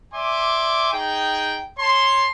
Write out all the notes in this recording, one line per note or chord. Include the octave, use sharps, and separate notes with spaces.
D5 E5 G#5 C6 D6
D#4 G#4 G5
C#5 A5 C6